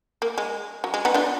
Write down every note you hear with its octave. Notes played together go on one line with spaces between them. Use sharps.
A#3
G#3
F#3
G#3
B3 D#4
D4 F4